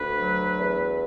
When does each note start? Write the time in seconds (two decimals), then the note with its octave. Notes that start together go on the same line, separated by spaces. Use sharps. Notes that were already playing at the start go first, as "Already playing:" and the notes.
Already playing: D2 B4
0.20 F#3
0.58 E2